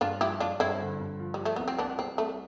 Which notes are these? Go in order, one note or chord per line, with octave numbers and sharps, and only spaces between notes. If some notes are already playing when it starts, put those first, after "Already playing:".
G2 D4 F4
F3 E4 G4
G2 D4 F4
G2 C4 E4
D3
G2
F3
F3 G3
A3
C2 B3
C4
C2 B3 D4
C2 C4
C2 A3